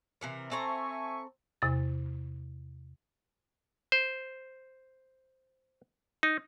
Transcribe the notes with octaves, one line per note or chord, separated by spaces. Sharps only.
C3 E3 A#4
C4 A4 E5 G#5 A#5 C#6
E2 C3 A6
C5
D#4